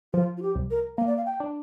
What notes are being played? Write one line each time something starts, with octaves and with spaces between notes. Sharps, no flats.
F3 F4
F4
G4
C2
A#4
A#3 F5
D5
F5
G5
D4